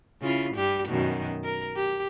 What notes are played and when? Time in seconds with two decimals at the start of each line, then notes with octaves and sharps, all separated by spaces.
0.22 C#3 E4 F4
0.55 G2 G3 G4
0.88 F#2 B2 D#3
1.44 A#4
1.76 G4